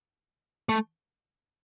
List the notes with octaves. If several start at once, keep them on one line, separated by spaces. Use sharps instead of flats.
A3